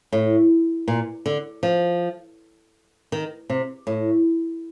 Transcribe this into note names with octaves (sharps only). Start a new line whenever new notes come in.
A2
A#2
D3
F3
D#3
C3
A2